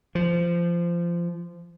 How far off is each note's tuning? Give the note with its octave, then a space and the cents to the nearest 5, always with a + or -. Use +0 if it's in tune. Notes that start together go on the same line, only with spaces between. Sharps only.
F3 -20